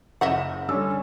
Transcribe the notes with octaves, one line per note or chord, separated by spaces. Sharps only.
F#1 D#5 E5 F#5 E7
D3 G3 C#4 E6